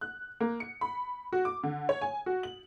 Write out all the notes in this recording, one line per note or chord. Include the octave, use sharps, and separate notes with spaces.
F#6
A#3
C#7
B5
F#4
D6
D3
C#5
G#5
F#4
F#7